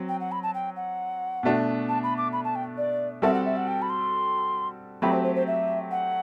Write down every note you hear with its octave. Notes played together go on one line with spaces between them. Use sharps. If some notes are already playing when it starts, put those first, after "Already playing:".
Already playing: F#3 C4
G5
F#5
B5
A5
G5
F#5
B2 A3 D4
A5
B5
D6
B5
A5
G5
D5
G3 C4 F#4 A4 E5
F#5
E5
F#5
G5
B5
C6
F#3 A3 C4 G4 B5
C5
C5
C5
E5
F#5